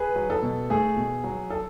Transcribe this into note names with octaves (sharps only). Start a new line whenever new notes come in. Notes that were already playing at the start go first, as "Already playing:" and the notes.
Already playing: G#4 B4
F#3
A4
B2
A3 G#4
B2
F#3
A4